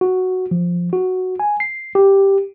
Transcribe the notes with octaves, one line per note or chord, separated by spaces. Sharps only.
F#4
F3
F#4
G#5
C7
G4